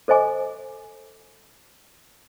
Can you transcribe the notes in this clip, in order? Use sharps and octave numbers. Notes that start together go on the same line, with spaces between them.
A4 C5 D#5 G#5 D6